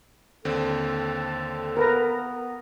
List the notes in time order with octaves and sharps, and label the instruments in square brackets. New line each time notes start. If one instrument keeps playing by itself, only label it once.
[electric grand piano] D#2 D3 C4 [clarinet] A4
[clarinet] B3 [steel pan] A#4 B4 A#5